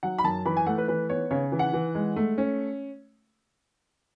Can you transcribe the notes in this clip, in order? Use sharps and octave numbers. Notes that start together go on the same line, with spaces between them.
F#3 F#5
B5
F#2 A5
E3 B5
G#5
A3 F#5
B4
E3 B4
B3 C#5
C#3 C#5
E3
F#5
E3
G#3
A3
C#4